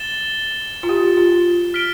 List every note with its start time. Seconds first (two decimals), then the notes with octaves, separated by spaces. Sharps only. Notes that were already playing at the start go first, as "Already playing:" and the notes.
Already playing: A6 E7 G7
0.83 F4
0.89 G4
1.17 F4
1.74 F6 B6 D7 G7